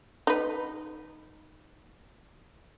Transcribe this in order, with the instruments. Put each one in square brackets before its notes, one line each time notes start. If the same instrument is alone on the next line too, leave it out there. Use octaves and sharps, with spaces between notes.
[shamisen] D#4 B4